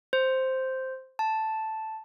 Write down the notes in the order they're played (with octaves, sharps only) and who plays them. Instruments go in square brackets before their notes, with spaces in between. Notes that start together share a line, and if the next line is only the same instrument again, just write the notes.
[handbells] C5
A5